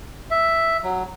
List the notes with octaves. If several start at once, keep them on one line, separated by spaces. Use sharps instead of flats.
E5
F#3